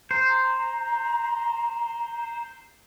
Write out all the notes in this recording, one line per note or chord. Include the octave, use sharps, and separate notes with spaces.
C5 A#5